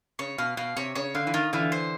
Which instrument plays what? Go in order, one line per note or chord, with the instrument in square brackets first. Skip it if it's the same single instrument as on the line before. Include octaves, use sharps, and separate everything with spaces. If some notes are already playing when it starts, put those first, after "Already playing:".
[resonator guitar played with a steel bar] C#3 [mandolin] C#5
[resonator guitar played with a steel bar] B2 [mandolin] F5
[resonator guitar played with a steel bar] B2 [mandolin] F5
[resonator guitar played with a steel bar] C3 [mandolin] C#5
[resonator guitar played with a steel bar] C#3 [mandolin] C#5
[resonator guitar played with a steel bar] D3 [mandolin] F5
[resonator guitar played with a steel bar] E3
[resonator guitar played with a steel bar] D#3 [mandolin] F4
[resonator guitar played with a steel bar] D3 E3 [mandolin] F4
[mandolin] C5